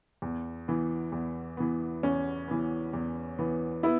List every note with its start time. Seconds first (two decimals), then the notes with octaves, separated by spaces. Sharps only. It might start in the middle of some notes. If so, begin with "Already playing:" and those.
0.22 E2
0.68 E3 B3
1.12 E2
1.57 E3 B3
2.03 E2 C#4
2.48 E3 B3
2.93 E2
3.39 E3 B3
3.83 B3 E4